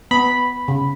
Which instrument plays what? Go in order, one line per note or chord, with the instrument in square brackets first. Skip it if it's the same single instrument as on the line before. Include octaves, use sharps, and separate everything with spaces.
[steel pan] B3 [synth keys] B5
[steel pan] C#3